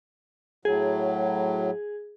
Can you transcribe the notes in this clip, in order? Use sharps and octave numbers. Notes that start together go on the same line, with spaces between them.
A2 F#3 G#4